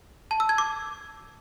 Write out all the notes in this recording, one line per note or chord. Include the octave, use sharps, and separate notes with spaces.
A5
E6
G#6
D6